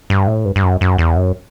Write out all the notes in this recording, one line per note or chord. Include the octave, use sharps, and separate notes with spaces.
G2
A2
G2
G2
F#2
F#2
E2
F#2